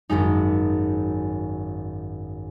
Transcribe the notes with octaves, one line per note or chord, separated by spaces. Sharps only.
G#1 F#2 G#3 D#4